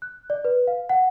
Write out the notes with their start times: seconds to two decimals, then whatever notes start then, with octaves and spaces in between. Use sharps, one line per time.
0.02 F#6
0.30 D5
0.45 B4
0.67 F5
0.89 F#5